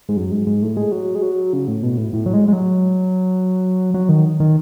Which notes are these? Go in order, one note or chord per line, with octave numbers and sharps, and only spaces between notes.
G#2
F#2
G#2
G#2
A2
G#3
F#3
G#3
F#3
C#3
A2
B2
A2
A2
F#3
G#3
G#3
F#3
F#3
D#3
D#3